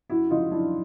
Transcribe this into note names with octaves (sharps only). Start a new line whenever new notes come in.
F#2 E4 F#4
C#3 F3 G#3 D#4 F4
F#2 D4 E4